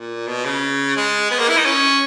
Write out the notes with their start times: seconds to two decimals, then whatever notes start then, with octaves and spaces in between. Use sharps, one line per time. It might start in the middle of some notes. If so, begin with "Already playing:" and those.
Already playing: A#2
0.27 B2
0.45 C#3
0.97 G#3
1.31 B3
1.39 A#3
1.49 E4
1.57 D#4
1.66 C#4